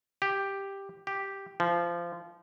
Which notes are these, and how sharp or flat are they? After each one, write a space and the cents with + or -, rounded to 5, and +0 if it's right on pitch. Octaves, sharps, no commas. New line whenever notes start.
G4 +5
G4 +0
F3 -25